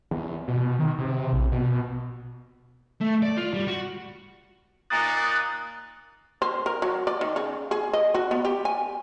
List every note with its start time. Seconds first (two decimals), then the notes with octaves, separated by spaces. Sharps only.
0.11 E2
0.48 B2
0.79 D#3
0.98 C3
1.33 A#1
1.52 B2
3.01 A3
3.22 D5
3.37 F4
3.54 G3
3.68 F#4
4.90 A#2 A#3 D#4 D#6 F#6 A6
6.42 C5
6.66 A#4
6.82 F#3
7.07 D5
7.21 D#3
7.36 C#3
7.71 G#4
7.93 D#5
8.14 F#4
8.31 B3
8.45 G4
8.65 G#5